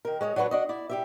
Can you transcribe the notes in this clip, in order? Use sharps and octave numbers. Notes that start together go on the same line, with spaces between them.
D#3 A#4
G#3 C#5 D#5
F#3 D4 F#4 B4 C#5
D4 F#4 D#5
E4 D5
G3 G4 E5